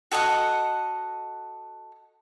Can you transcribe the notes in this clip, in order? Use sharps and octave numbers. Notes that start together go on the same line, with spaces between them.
F#4 A4 D#5 F#5